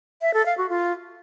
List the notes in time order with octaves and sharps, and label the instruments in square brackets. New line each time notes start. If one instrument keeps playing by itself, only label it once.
[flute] E5
A4
F5
F#4
F4